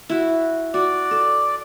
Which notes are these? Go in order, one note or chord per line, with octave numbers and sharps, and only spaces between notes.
E4 F#4
F#4 D5
A4